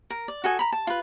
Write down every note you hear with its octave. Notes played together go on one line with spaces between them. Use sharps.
A#4
D5
F#4 A4 D#5 G#5
A#5 B5
A5
F4 B4